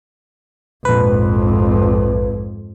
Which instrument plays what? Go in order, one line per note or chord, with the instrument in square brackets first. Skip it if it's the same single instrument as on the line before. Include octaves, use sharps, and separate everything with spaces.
[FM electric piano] A#1 B4 [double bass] F2 G#2